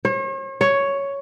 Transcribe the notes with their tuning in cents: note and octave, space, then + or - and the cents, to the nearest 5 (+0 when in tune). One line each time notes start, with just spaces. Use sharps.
C#5 -45
C#5 +5